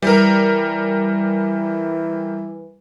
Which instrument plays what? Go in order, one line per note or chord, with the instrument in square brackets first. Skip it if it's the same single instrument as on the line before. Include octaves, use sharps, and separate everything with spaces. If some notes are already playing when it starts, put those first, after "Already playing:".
[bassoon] E3 [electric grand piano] G3 A#4